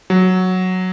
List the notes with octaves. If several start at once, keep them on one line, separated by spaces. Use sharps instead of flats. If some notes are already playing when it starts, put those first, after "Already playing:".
F#3